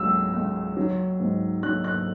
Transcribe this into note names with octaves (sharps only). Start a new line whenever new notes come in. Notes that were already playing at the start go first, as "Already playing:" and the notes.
Already playing: C#2 C#3 F#3 E6
C#2
F#3
G#2
F#3 F#6
F#6